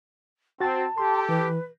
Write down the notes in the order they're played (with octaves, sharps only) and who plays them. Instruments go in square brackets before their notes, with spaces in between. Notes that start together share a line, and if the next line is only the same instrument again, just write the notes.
[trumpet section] C4 [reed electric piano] F#4 A6 [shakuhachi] A5
[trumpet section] G4 A4 [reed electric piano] C6
[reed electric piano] E3 [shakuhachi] B4